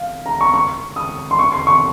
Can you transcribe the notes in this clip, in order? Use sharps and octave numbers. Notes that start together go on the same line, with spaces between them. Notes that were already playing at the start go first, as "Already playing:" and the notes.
Already playing: F5
A#5
C#6
C#6
D#6
C6
C#6
C6
C#6